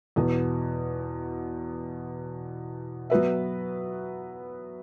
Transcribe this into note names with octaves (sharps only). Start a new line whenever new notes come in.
E2 B2 B3
F#3 B3 F#4 B4 E5